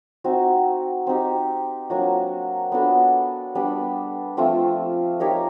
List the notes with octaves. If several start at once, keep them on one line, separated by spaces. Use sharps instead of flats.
C4 D#4 F#4
C4 D#4 G4
F#3 A#3 D4 F#4
B3 D4 F#4 A4
G3 B3 D4
F3 A3 C4 F4
D#4 G4 A#4 C#5